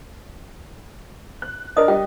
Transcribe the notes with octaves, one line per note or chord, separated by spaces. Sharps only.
F#6
D4 A#4 D#5 D#6
G3 D#5 G5